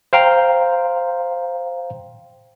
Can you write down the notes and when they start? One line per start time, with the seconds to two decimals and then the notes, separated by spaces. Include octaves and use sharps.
0.13 C5 F5 G5 A#5 C6